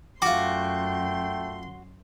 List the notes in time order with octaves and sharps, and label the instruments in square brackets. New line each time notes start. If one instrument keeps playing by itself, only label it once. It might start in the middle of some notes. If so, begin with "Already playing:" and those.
[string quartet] F#2 C6 [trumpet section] A3 G5 [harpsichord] F4 D6 [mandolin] F#4